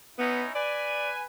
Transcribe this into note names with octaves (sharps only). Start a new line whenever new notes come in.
B3 C#4 D#4 E4
B4 D5 G#5